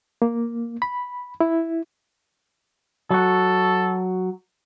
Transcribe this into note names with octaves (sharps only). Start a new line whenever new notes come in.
A#3
B5
E4
F#3 F#4 A4